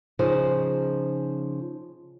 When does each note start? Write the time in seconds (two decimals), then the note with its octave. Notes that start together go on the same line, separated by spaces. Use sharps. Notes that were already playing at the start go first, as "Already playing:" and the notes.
0.19 C#3 F3 D#4 G#4 C5